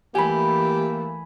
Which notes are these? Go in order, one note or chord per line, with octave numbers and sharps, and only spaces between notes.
E3 A3 A#3 G4 G#5 B5